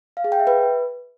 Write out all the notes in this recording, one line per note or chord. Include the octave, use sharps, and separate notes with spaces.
F5
G#4
G5
E5
B4